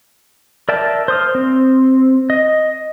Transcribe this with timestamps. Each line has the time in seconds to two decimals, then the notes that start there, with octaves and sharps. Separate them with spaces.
0.69 A#4 D5 E5 G5 A5
1.08 C5 D#6 F6
1.35 C4
2.30 D#5